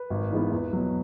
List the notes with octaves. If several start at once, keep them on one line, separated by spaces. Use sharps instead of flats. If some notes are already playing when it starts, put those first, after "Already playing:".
Already playing: B4
G#1
G#2 E3 G#3 B3
E2
B2 F#3